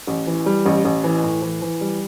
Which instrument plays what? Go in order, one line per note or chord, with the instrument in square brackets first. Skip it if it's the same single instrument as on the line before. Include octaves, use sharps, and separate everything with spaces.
[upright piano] A1
E3
G3
A1
A1
E3
A2
E3
E3
G3